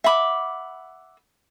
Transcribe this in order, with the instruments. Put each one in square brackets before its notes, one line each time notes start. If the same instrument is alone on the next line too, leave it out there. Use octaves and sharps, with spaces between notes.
[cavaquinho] E5 F#5 B5 D6